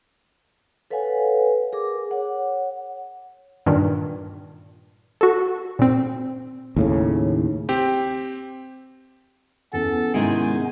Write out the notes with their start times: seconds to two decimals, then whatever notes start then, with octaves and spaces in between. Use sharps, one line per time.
0.90 A4 B4 C#5 F5 F#5 G#5
1.73 G#4 A#4 D6
2.11 C#5 F#5
3.66 G2 A#2 D#3
5.21 F#4 A4
5.79 A#2 C4
6.76 D#2 A2 C#3
7.69 C4 G4
9.73 E2 B3 C#4 A4
10.14 G#2 C3 D#3 G#3 E4 G#5